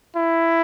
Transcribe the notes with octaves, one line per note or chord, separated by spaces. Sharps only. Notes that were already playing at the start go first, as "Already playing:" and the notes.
E4